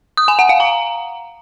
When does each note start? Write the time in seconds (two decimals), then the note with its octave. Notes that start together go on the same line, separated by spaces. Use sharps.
0.17 D#6
0.28 G#5
0.39 F#5
0.49 F5
0.60 A#5